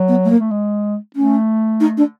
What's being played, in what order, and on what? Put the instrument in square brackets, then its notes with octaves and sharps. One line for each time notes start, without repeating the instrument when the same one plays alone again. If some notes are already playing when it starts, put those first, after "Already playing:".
Already playing: [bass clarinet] F#3
[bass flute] B3
A3
A#3
[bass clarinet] A3
G#3
[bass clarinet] A3 [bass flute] C#4
[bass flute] D#4
D4